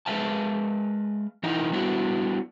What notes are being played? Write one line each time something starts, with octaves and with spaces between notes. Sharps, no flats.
G#3 B4 E5 F5 A5
E3 D#4 E4 D#5 F#5 A#5
G3 B3 D4 E4 F#4